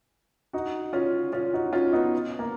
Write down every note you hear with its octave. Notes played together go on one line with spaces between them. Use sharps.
D#4 F#4
C#4 F4
C#4 F4
D#4 F#4
C#4 F4
B3 D#4
A#3